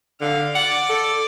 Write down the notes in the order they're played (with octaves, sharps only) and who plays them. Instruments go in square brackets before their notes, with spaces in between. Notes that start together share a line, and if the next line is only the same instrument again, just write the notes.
[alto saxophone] D3 [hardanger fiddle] F5
[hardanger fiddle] D5 [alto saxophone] F#5
[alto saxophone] A4